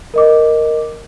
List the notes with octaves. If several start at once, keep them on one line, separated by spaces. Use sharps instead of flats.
A#4 D#5 D6